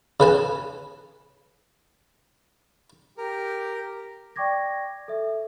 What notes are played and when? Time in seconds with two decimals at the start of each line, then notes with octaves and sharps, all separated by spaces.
0.20 C#3 B4 G#5 A5
3.18 G4 A#4
4.36 D5 G5 C#6 D6 G#6 A#6
5.08 A4 E5